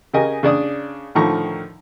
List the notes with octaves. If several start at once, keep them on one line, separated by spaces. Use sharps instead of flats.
C#3 G4 A#4 D#5 G#5
C#3 D4 D5 D#6
A2 D3 D#3 F3 A#5 C#6